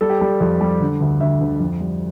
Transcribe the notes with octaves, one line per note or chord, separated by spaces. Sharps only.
G3 A4
G4
G3 A4
F2 A4
G3
D3
D2
D2 E5
D2
F2
G3